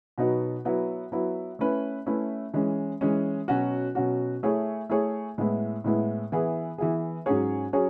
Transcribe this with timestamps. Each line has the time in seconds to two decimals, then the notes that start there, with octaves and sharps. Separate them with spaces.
0.18 B2 F#3 B3 D#4
0.65 F#3 B3 E4
1.12 F#3 B3 E4
1.59 A3 C#4 E4 B4
2.06 A3 C#4 E4 B4
2.53 E3 G#3 C#4
3.01 E3 G#3 C#4
3.48 B2 F#3 C#4 F#4
3.95 B2 F#3 C#4 F#4
4.43 A3 E4 G#4 C#5
4.90 A3 E4 G#4 C#5
5.38 A2 G#3 B3 E4
5.84 A2 G#3 B3 E4
6.32 E3 B3 E4 G#4
6.78 E3 B3 E4 G#4
7.26 G#2 F#3 C#4 G#4 C#5
7.73 F#3 C#4 G#4 C#5